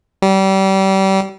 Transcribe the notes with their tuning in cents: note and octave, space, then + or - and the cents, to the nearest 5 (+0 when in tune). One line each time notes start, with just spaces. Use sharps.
G3 -30